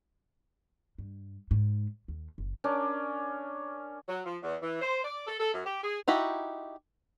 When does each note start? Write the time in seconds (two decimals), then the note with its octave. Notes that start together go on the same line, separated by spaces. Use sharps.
0.98 G2
1.51 G#2
2.08 D#2
2.38 F#1
2.64 C#4 D4 A#4 D5
4.08 F#3
4.25 F3
4.43 E2
4.62 E3
4.82 C5
5.04 D5
5.27 A4
5.40 A4
5.54 F#2
5.66 G4
5.83 G#4
6.08 D#4 E4 F#4 G4